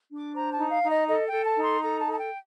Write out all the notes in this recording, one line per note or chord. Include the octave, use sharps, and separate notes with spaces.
D4 D6
C5 A#5
A5
D#4
F5
D#4
D#5
A4 D#5
G5
A4
A5
D#4
C6
A4 A#5
A5
A4
A5
G5